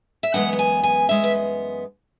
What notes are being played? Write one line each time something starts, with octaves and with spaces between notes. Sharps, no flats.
E5
F#2 E3 G#3 B3 F#5
F#5
G#5
G#5
F#2 E3 G#3 B3 E5
B4